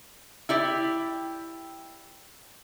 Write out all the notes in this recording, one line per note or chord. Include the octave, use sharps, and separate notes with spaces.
E4 G4 D5